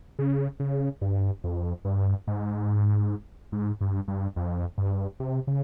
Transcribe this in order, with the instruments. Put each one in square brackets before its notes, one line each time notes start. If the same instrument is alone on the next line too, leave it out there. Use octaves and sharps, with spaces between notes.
[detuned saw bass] C#3
C#3
G2
F2
G2
G#2
G#2
G2
G2
F2
G2
C3
C#3